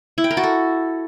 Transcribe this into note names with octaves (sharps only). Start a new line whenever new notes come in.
E4
G5
A#4
F#4
A4